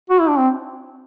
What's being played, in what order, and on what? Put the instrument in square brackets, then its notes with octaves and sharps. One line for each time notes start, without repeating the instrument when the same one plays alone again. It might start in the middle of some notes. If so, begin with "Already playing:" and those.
[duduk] F#4
E4
D4
C4